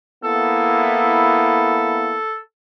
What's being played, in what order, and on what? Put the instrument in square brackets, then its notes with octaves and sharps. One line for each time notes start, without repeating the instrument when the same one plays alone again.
[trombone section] A#3 B3 E4 [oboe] A4